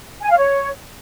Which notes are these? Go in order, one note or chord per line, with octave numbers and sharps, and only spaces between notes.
G#5
F5
C#5